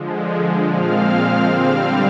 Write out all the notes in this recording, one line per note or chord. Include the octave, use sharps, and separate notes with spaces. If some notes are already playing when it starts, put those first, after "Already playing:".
Already playing: D3 F3 G#3
A#2 F3 G#3 C4 F5 F6
D3 G3 C4 F5 F6